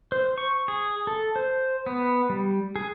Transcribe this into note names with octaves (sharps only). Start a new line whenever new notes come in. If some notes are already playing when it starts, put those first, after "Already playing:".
C5
C#6
G#4
A4
C5
B3
G3
G#4